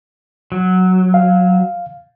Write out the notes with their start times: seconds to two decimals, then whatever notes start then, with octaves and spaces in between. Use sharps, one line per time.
0.52 F#3
1.14 F5